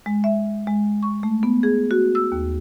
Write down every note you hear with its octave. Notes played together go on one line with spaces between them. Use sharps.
G#3
E5
G#3
C#6
A3
B3
G#4
F#4
E6
D#2